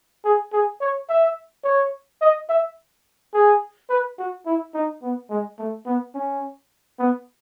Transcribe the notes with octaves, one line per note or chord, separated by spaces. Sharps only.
G#4
G#4
C#5
E5
C#5
D#5
E5
G#4
B4
F#4
E4
D#4
B3
G#3
A3
B3
C#4
B3